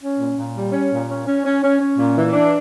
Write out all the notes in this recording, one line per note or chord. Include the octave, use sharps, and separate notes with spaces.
C#4
A#2
A#2
G3
C#4
A#2
C#4
C#4
C#4
C#4
C#4
A#2
E3
D4